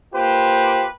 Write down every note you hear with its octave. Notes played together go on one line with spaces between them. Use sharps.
A#3 F4 G4 B4 C5